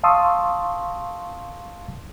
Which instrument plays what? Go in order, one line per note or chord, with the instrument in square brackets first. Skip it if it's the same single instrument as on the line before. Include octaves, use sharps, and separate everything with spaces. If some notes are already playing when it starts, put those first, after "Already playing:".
[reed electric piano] F5 A5 C6 C#6 D#6 E6